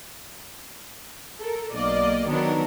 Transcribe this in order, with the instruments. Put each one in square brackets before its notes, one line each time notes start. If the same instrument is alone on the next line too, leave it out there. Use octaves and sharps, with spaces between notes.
[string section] A4 A#4
B1 A#3 D5 D#5
D#3 F#3 B3 D4 A#4